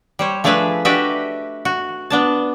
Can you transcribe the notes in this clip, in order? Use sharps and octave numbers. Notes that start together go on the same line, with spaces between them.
G3 C5 C#5
F3 A3 D4 G#4 B4 E5
D4 F#4 G4 B4 D#5 E5
F#4
B3 D4 A5